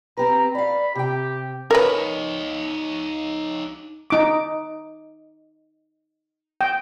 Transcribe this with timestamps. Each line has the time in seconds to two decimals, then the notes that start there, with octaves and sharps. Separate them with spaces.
0.17 C4 G4 B4 A#5
0.55 D5 F5 B5
0.95 C3 G4 G5
1.71 D#4 A#4 B4 C#5
4.10 D#4 D6
6.61 G5